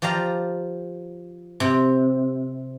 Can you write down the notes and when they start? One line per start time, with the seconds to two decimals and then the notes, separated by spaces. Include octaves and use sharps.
0.02 F3 G4 D5 F5 A#5
1.60 C3